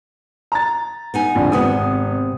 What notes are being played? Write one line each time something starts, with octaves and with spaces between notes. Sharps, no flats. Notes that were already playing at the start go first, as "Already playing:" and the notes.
A#5 A6
B3 D#4 G#5
A#1 F2 D3
G#1 C3 B3 G#5 D#6